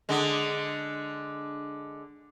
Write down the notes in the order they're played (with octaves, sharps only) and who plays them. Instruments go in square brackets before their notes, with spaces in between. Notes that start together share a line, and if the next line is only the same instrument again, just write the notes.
[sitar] D3 G#3